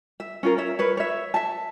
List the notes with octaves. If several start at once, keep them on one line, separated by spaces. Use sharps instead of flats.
E5
C#4 F4 A#4
C#5 E5
A#4 B4 C#5
C#5 E5
E5 A5